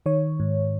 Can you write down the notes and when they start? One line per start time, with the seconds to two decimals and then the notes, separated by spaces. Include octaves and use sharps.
0.06 D#3 C#5
0.40 G#2